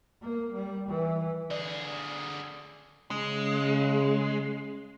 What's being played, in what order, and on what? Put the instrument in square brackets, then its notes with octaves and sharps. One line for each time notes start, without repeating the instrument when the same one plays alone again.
[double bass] A#3
G3
E3
[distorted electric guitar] D3 G#4 [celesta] D5
[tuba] C#3 [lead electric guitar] G#3